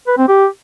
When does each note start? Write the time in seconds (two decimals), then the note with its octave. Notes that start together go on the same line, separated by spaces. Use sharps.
0.08 B4
0.18 C4
0.29 G4